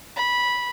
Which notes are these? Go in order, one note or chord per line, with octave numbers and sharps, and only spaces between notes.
B5